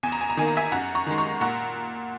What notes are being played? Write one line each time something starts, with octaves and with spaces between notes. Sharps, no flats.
E2 G#5
A#5
G#5
A#5
D#3 A#3 G#5
A#5
E5 G#5
F#2 F#5 A#5
A#5 C#6
D#3 G#3
A#5 C#6
A#2 F#5 A#5